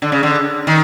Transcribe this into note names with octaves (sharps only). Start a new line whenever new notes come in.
D3
C#3
D3
D#3